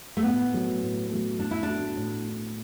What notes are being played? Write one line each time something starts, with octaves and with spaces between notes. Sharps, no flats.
A3
A2 B3
F#3 A3
A2
F#3 A3
A2 D4
E4
D4
A3 F#4
A2